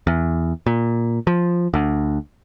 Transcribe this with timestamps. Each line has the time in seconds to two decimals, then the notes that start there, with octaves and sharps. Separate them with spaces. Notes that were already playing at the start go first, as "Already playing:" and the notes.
0.07 E2
0.66 A#2
1.27 F3
1.74 D2